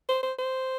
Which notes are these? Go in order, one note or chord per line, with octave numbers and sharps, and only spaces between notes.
C5
C5
C5